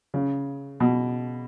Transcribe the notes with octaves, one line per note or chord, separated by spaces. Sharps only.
C#3
B2